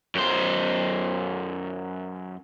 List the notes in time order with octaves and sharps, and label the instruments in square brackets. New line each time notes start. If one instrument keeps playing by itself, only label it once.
[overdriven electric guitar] F#2 C5